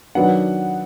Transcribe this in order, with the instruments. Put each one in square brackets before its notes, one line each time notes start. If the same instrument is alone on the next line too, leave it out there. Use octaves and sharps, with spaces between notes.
[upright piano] D#3 F#3 B3 D4 F#5